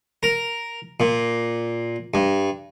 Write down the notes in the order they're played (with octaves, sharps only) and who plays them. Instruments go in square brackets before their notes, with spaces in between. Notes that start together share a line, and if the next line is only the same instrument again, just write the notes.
[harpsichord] A#4
A#2
G2